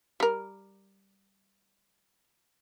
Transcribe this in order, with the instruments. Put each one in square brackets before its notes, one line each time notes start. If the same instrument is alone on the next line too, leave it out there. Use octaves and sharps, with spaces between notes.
[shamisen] G3 A#4